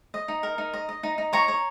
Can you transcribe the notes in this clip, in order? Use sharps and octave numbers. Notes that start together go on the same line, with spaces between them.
D#5
D#4
A#4
D#4
D#5
D#5
D#4
D#4
C#5 A#5 C#6
C#5